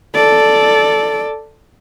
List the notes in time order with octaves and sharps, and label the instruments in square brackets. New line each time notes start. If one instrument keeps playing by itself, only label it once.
[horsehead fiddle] A4 D5